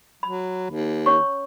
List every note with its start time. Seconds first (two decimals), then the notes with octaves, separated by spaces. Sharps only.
0.23 F#3 B5
0.70 D#2
1.06 C#4 C#5 C#6